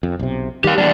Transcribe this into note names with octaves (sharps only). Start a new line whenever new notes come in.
F2
B1 C3
D#3 G3 G4 F5
E2 A#2 G3 D4